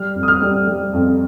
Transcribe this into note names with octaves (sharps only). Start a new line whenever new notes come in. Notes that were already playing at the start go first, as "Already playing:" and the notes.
Already playing: G3 F6
F2
D#6
F6
G3
G3
F2